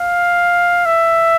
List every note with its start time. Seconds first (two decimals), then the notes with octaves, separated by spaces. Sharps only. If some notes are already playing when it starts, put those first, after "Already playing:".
Already playing: F5
0.85 E5